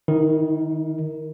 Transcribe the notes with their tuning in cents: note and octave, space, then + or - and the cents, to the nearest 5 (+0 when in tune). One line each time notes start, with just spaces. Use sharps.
D#3 +0 E4 -40